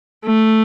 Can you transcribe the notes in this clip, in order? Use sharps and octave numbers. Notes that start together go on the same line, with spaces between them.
A3